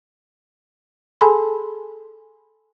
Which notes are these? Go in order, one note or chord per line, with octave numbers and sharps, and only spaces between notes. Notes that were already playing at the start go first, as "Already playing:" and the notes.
G#4 A4 G#5 A5 B5 C6